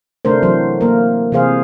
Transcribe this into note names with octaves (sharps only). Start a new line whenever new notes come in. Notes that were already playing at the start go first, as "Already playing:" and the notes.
C3 A3 D4 A#4 C5
E3 F#3 C5
A#3 A#4
C3 E3 G#4 C5 F5